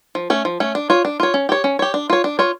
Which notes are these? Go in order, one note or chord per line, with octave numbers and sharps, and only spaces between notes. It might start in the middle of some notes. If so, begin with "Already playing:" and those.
F3
A3 C#4
F3
A3 C#4
D4
F4 C#5
D4
F4 C#5
C#4
G4 C#5
C#4
G4 C#5
D4
F4 C#5
D4
F4 C#5